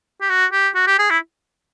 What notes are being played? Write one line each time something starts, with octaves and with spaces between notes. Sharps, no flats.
G4
F#4
G4
F#4
G4
G#4
E4